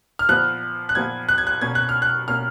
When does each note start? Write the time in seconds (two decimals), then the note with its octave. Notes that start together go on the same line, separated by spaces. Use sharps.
0.19 F6
0.29 A#2 F3 B3 F#6
0.89 F#6
0.95 A#2 F3 B3 G#6
1.29 F#6
1.38 G#6
1.47 F#6
1.61 B2 A#3 C#4 G#6
1.75 F#6
1.89 F6
2.02 F#6
2.28 B2 A#3 C#4 F6